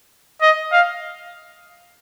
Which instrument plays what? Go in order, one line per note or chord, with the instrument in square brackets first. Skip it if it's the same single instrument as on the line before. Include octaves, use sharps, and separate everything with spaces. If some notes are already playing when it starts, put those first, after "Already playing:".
[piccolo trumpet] D#5
F5